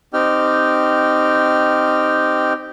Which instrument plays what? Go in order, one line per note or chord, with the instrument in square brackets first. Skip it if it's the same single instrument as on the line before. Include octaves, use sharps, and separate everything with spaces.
[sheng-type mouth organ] C4 D#4 G4 G5 F6